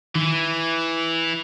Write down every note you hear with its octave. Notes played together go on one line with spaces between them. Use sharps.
D#3 E3